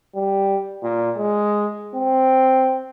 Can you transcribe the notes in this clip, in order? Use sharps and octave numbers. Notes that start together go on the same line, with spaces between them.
G3
A#2
G#3
C4